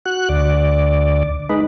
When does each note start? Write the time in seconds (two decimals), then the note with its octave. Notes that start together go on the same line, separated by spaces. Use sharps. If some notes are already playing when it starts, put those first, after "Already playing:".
0.06 F#4 F#6
0.29 D2 D5
1.49 G#3 D#4 B4